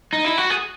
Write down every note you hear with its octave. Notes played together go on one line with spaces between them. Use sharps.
D#4
E4
F#4
G#4